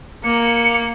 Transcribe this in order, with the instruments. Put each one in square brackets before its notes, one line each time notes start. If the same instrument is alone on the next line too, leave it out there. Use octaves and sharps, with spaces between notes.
[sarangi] A#3 [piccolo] C#7